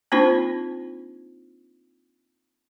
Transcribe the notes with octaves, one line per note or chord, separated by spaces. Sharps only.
A#3 C4 D4 D#4 F4 C5